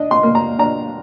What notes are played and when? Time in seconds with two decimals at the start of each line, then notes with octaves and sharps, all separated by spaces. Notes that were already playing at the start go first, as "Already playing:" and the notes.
Already playing: D4 D#5
0.11 C6
0.23 A#3
0.35 A#5
0.59 D4 A#5